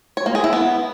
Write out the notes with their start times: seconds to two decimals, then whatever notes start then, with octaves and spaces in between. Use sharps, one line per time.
0.17 C#5
0.26 A#3
0.35 G#4
0.44 E4
0.53 B3